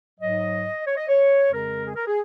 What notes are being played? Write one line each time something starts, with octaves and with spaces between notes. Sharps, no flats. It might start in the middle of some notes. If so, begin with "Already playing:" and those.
G#2 F#3 D#5
C#5
D#5
C#5
F2 C#3 G#3 A#4
G#4
A#4
G#4